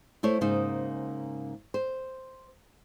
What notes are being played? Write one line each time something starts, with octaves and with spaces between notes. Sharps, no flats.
A3 E4 C5 C#5
G#2 C#3 A#3 D#4 C5
C5